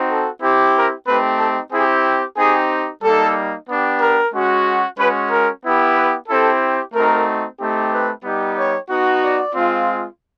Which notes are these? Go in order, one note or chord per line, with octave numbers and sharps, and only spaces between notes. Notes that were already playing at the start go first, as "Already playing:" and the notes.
Already playing: C4 D#4 F#4
A4
C4 E4 G4
A#4
A3 C4 D#4 G4 B4
A4
C4 E4 G4 G#4
C4 D#4 G4 G#4
G3 A#3 D#4 A4
B3 D4 G4
A#4
G#3 C#4 F#4
G#3 C#4 F#4 B4
A#4
B3 E4 G4
B4
C4 E4 G4 A4
A3 C4 D#4 F#4 A#4
A3 C4 D#4 G4
B4
G3 B3 D#4 G4
C#5
B3 D#4 F#4
D5
G#3 C4 F4